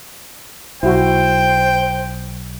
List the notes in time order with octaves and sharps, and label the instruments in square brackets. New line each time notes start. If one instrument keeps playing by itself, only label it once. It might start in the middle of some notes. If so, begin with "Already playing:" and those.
[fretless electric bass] B1 [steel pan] E4 F#4 [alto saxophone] C5 [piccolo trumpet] G5